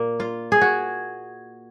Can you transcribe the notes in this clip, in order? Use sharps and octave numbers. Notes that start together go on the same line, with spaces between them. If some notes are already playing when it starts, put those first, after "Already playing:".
Already playing: A#2 A#3
F4
G#4
F#4